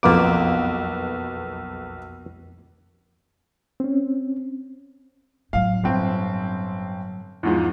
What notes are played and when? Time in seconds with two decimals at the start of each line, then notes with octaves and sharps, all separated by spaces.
0.03 B1 F2 B2 A#3 F4 B4 D6
3.80 C4 C#4
5.53 A2 F#3 F5
5.84 G1 C4
7.43 E2 G#2 F3